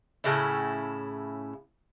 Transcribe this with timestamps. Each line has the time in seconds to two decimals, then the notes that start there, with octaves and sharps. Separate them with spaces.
0.24 A2 C#3 E4